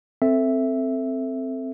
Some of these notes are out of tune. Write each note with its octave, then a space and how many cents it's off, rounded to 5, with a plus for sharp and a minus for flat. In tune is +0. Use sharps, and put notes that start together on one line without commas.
C4 +0 A4 +15 E5 +0